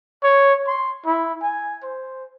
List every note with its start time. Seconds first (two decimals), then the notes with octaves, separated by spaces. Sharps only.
0.23 C#5
0.67 C6
1.06 E4
1.42 G#5
1.83 C5